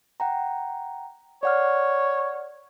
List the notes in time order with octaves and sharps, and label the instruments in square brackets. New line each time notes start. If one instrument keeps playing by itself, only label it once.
[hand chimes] F#5 G5 A#5
[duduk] C#5 [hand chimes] D5 F#5 F6